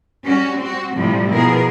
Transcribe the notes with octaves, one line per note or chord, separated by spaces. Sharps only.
G3 C#4 F#4
C4 F#4
A2 C3 F3 G3
B2 F3 B3 E4 G#4 A#4